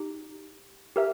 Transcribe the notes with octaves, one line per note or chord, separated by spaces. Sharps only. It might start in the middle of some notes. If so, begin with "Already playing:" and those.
Already playing: D#4 G4
G4 A#4 E5